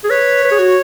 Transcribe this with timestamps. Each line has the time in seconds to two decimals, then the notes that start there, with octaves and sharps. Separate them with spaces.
0.04 G#4
0.09 B4 C#5
0.44 B4
0.51 G#4
0.59 F#4